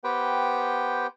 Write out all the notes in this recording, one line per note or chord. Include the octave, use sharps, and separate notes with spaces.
B3 G4 B4 C5 G5